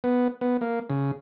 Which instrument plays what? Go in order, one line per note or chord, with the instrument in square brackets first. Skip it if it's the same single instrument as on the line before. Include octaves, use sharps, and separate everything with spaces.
[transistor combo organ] B3
B3
A#3
C#3